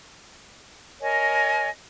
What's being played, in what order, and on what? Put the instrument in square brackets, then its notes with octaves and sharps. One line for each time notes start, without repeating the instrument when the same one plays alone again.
[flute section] A#4 C#5 D#5 G#5